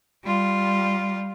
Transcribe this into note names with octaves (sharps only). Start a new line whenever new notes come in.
G3 F4